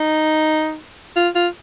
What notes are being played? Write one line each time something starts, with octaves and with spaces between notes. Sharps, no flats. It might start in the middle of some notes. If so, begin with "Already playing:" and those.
Already playing: D#4
F4
F4